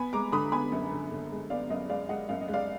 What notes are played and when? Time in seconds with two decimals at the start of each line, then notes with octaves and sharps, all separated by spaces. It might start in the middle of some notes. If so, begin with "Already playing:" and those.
Already playing: B3 G#5 B5
0.13 G#3 A#5 D6
0.32 D3 B5 D#6
0.52 B3 G#5 B5
0.72 F#2
0.92 D3
1.11 D3
1.31 G#3
1.50 B3 D5 F5
1.70 F#2 D#5
1.89 G#3 D5 F5
2.09 G#3 D#5 F#5
2.29 F#2 F5
2.41 D#5
2.48 G#3
2.54 D5 F5